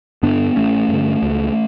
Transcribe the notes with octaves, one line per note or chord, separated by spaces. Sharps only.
G2 D3 B3 D4
A1 A3 C#4
G2 D3
C#2